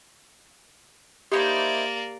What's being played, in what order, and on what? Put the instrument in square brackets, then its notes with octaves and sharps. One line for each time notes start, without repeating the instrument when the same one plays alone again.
[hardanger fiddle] A#3 D5 [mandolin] D#4 E4 C5 [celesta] G4